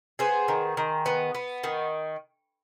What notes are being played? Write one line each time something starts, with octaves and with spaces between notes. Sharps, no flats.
B3 G#4 C5
D#3
D#3
B3
B3
D#3